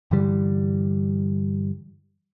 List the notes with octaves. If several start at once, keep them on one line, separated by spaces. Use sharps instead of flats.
G2 D3 E3 G3